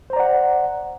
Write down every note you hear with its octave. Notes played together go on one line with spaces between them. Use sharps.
C5 D5 F#5 A#5